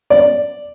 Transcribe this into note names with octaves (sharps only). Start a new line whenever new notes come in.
D5